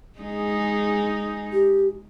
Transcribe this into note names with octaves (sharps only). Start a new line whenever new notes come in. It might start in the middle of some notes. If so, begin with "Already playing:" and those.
G#3 D#4 G#4
G4